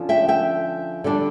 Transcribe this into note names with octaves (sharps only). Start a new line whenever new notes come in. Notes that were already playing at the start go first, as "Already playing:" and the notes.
Already playing: D3 F3 C#4
E5 G5
E5 G5
D3 G3 D4